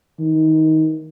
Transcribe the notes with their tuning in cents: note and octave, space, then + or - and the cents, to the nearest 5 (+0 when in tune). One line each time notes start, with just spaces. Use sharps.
D#3 +20